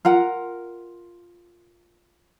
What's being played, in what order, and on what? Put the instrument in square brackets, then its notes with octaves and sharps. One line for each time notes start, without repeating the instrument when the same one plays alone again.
[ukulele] F4 A#4 F#5